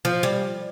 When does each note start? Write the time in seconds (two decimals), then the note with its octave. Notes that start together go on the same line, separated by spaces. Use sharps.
0.05 F3
0.23 G3